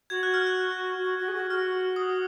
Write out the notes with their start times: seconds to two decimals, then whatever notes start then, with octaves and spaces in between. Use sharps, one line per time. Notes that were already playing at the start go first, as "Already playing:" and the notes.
0.10 F#4 G#6
0.23 F#6
0.34 F6
0.47 F#6
1.04 F#4
1.19 F#4
1.28 G#4
1.35 F#4
1.50 F#4 F6
1.96 D#6